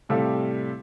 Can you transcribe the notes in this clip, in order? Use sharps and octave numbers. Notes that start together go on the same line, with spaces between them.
A2 C3 G3 A4 F5